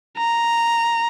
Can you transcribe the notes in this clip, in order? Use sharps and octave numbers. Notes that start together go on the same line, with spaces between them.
A#5